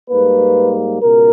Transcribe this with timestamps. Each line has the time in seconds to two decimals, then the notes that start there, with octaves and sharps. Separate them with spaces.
0.10 G#2 G3 A#3 B4
1.01 C#2 B2 A#4